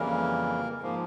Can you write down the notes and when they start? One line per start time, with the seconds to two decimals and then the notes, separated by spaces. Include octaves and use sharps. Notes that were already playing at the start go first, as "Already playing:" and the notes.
Already playing: F2 C#3 E3 G3 A#3 A#4
0.81 G#2 F3 A#3